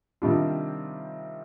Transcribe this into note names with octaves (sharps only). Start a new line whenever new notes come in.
C3 D#3 G3 D4 F4